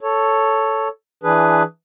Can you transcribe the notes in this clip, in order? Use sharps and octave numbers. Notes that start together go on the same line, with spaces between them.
A4 C#5
E3 D4 G#4 B4